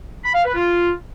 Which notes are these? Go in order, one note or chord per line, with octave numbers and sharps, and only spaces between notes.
B5
F5
B4
F4